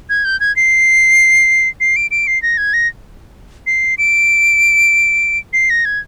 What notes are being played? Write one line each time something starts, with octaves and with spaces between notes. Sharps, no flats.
G#6
G6
G#6
C7
C7
D7
D7
C7
A#6
G#6
A#6
C7
D7
C7
A#6
G#6